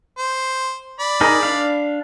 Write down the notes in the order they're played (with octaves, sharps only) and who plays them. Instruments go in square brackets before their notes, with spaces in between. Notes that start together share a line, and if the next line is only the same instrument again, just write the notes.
[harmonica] C5
D5 B5
[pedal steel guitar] D#4 G#4 A#4
D4 F5